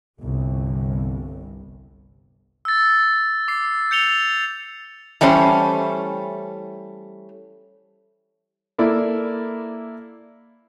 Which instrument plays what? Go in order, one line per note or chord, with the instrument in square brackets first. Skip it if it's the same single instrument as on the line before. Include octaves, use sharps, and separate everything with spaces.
[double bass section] G1 C2
[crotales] E6 A6
D6 C7
G6 C#7 F7 G7
[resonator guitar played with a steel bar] E3 G3 A3 C#4 C5
[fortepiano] A#3 E4 A4 D5